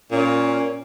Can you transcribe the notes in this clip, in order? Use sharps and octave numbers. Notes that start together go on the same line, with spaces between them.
A#2 C#4